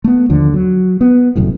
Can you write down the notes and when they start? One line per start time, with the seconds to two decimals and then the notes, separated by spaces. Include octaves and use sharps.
0.04 A3 B3
0.29 D#2 D3 F3
0.54 F#3
1.01 B3
1.36 E1 C2 F#2 A2